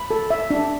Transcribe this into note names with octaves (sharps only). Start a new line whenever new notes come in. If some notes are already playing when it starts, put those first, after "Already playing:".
Already playing: B5
A4
E5
D4